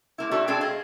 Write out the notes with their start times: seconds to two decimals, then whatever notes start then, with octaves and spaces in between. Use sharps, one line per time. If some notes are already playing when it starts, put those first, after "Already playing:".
0.18 G#3 A#3 E4
0.31 D4 D#4 F#4 A4 E5
0.48 B2 G#3 C4 D4 G#4 A4
0.61 G#4 D#5 F5